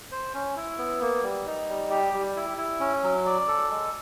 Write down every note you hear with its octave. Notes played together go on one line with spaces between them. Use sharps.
C5
C#4
E4
B3
A#3
G3
D#4
G3
G4
G3
E4
E4
C#4
F#3
D5
A4
G#3